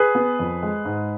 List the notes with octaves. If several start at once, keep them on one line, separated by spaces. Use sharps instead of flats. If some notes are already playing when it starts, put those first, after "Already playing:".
Already playing: G#4 B4
B3
F2
G#3
G#2